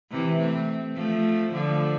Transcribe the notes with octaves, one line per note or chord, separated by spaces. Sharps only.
C3 E3
A3 C4
F3 A3
D3 F3